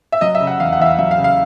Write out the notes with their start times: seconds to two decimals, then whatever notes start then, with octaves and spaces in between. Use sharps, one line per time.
0.12 E5
0.21 F#3 D#5
0.35 E5
0.40 C#3
0.47 F#5
0.60 E2 F5
0.73 F#5
0.79 E2 E5
0.85 F5
0.98 F#3 E5
1.11 F5
1.18 C#3
1.24 F5